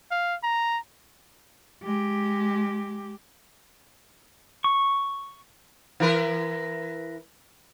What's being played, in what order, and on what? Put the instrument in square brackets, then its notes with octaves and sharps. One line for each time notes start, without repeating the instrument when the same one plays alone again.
[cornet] F5
A#5
[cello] G#3 G4
[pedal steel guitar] C#6
[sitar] E3 A#4 B4